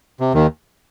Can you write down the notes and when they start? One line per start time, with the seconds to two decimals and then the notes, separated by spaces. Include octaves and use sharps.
0.20 C3
0.34 D#2 D#3